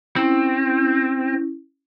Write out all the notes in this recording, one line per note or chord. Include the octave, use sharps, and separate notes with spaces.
C4 C#4 E4